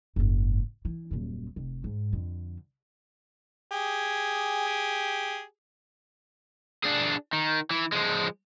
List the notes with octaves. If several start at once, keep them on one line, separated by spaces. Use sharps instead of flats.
F#1 G#2
E3
D#1 F#2
F1
G#2
F2 D3
G4 G#4
D4 G#4
D#3
E3
F3 G#3